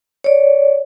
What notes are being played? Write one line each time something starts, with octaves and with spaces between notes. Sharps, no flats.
C#5 D5